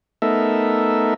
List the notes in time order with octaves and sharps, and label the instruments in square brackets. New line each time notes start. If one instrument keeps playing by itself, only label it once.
[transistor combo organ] A3 B3 D#4 A4 A#4 E5